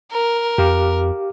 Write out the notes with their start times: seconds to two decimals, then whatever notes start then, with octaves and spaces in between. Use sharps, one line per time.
0.12 A#4
0.58 F2 G4 F5 D6